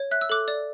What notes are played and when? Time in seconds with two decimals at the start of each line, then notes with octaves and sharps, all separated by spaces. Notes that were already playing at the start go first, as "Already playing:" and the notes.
Already playing: C#5
0.11 E5 F#6
0.21 E6
0.29 A4 D6 F#6
0.48 D5